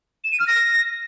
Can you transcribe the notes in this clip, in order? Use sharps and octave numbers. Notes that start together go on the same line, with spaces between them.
E7
D#7
F6
A#6